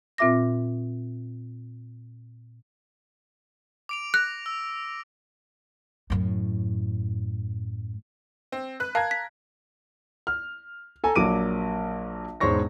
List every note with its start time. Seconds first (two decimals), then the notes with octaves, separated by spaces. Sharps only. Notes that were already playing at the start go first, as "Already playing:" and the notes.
0.18 A#2 C4 F4 E5 D6 A#6
3.89 D6 D7 F7
4.14 F#6 A#6
4.46 E6
6.10 F#2 A2
8.52 C4
8.80 B4 F#6
8.95 A#4 F5 A5 G#6
9.11 B6
10.27 F6
11.04 A4 G#5 A#5
11.15 A#1 F#3 A#3 D6 D7 D#7
12.40 E1 G#2 C5 C#5 C#6 A#6